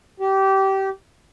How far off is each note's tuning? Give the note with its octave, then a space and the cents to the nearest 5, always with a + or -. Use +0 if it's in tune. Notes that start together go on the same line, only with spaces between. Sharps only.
G4 -20